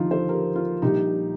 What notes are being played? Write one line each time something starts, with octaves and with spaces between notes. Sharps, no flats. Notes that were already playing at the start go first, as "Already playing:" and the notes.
Already playing: D#2 D3 F3 D#4 F4
A4 C5
G4 A#4
F4
A#1 A#2 G3 D#4 G4